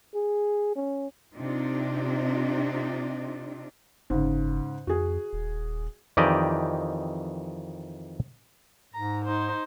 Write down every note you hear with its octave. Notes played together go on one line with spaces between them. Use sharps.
G#4
C#4
C3 C4 D4 D#4 F4
F#1 G#2 C#3
F2 F#4 G#4
D#1
F2 D#3 E3 G4 D5 D#5
G#2 A#5
D#4 C5